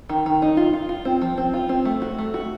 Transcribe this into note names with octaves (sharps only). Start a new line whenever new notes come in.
D#3
D#3
D#4
F4
F4
F4
C4
F3
C4
F4
C4
A3
F#4
A3
F#4